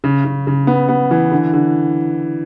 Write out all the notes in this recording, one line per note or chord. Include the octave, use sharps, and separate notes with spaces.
C#3
C#3
C#3
B3
B3
E3
D3
D3